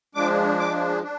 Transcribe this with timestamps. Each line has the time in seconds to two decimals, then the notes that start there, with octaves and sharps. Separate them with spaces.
0.15 F3 G#3 D4 D6
0.60 D6
1.03 D4